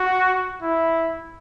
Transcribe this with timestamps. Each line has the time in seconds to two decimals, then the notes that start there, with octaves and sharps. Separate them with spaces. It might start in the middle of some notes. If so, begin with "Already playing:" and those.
Already playing: F#4
0.62 E4